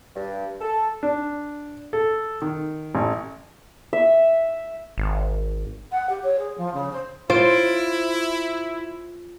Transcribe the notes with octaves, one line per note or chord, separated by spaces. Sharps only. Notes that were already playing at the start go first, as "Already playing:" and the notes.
G2
A4
D4
A4
D#3
A1
E5
G#1
F#5
G4
C#5
G#4
F3
C#3
C5
E4 F4 C5 A6 D7